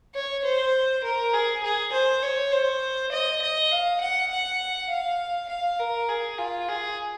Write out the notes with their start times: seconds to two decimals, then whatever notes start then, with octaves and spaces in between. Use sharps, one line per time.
0.15 C#5
0.45 C5
1.04 A#4
1.34 G#4
1.63 G#4
1.93 C5
2.23 C#5
2.52 C5
3.12 D#5
3.42 D#5
3.71 F5
4.01 F#5
4.31 F#5
4.90 F5
5.49 F5
5.79 A#4
6.09 G#4
6.39 F4
6.68 G#4